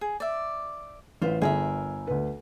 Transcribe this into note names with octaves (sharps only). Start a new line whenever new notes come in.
G#4
D5 E5
A1 F4 B4 C5
G1 G#4 A#4 E5
D2 B4